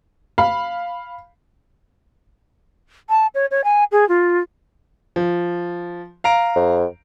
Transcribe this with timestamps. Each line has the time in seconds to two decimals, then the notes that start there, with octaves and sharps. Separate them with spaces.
0.38 F5 B5
3.09 A5
3.34 C#5
3.51 C#5
3.64 G#5
3.92 G#4
4.09 F4
5.16 F3
6.24 F5 A#5 D7
6.55 F2